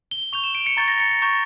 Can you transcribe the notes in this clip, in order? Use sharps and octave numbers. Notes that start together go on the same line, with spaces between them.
G7
C#6 G6 F7
E7
D7
C#7
A#5 C#6 G6 A6
A#6
C#7
C#7
A#5 C#6 G6